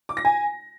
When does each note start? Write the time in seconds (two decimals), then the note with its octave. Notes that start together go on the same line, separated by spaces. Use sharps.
0.09 D6
0.17 A#6
0.25 G#5